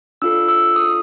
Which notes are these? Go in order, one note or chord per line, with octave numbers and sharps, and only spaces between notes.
D4 F4 A4 E6
E6
D#6